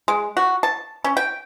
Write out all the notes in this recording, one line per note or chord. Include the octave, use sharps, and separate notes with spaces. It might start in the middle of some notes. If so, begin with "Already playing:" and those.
G#3
F#4
A5
C#4
G5